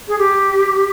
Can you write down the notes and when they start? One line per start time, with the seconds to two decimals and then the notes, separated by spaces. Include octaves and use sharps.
0.08 G#4
0.18 G4